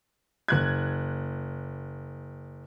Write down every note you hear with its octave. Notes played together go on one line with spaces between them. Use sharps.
F#1 F#6 G#6